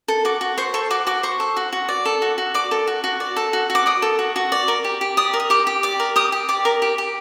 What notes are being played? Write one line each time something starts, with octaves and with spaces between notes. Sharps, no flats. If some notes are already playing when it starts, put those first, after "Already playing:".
A4
F#4 D6
F#4
C5 C#6
A4 C#6
F#4 D6
F#4 D6
C5 C#6
A4
F#4
F#4
D5
A4
F#4
F#4
D5 D6
A4
F#4
F#4
D5
A4
F#4
F#4
D6
D5 D#6
A4
F#4
F#4
D5
A#4
G4
G4
D5 D#6
A#4
D#6
G4 D6
G4
D5 D6
A#4
G4 D#6
G4
D5 D6
A#4
G4
G4